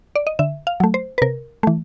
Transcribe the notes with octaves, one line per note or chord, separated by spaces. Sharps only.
D5
D#5
D3 E5
F5
F#3 A3
C5
B4
C3 A#4
E3 A3